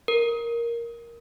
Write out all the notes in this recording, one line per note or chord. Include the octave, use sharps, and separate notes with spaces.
A#4